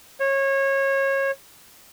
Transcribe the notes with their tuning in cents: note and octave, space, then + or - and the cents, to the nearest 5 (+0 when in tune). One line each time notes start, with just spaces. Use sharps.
C#5 -25